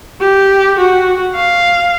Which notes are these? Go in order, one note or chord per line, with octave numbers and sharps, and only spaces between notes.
G4
F#4
F5